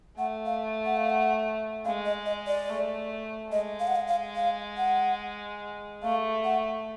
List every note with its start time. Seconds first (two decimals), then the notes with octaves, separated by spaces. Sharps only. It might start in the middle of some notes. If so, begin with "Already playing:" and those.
0.17 A3 F#5
0.46 F5
0.85 F#5
0.97 F5
1.10 F#5
1.85 G#3 F5
2.06 D#5
2.26 D#5
2.47 D5
2.69 A3
3.51 G#3 D#5
3.80 F5
3.87 F#5
3.96 F5
4.07 F5
4.36 F5
4.77 F#5
6.03 A3 F5
6.44 F#5